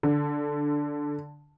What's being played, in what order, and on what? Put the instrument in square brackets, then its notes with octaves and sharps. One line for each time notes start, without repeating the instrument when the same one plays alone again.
[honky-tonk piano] D3